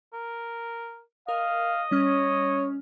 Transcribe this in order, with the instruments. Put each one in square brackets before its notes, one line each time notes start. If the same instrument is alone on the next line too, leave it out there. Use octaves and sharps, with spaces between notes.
[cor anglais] A#4
[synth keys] A#4 [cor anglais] D#5 [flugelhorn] F5
[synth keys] G3 C#4 F6 [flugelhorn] C#5